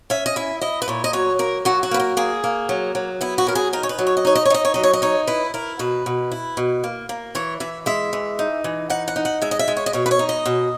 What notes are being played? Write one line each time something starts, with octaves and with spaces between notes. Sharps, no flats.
C#4 E5
D#5
E4 E5
E4 D#5
B4
A#2 C#5
D#5
F#3 C#5
A#3 A#4
F#3 F#4
F#4
A#3 B4
A#4
A#3 G#4
A#3
F#3
F#3
B3 E4
F#4
F#3 A#4
G#4
D#4 A#4
C#5
B4
F#3
C#5
D#5
D#4 C#5
D#5
C#5
D#4 D#5
C#5
F#3 D#5
C#5
D#5
D#4 C#5
E4 B4
E4 A#4
B2 B4
B2
E4
B2
A#3
A#3
E3 C#5
E3 E5
G#3 E5
E3
D#4
E3
D#4 F#5
F#5
D#4
F#5
G#3 E5
D#5
E5
G#3
C#5
D#5
B2 C#5
B4
C#5
D#4
D#5
B2